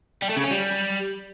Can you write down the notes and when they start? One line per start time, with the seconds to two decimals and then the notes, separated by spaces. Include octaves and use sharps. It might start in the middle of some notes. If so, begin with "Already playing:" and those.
0.22 G3
0.29 A3
0.37 C#3
0.44 C#4
0.51 G3